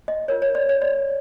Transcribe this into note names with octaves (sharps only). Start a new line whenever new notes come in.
D#5
F4 A#4 C#5
C#5
D5
C#5
D5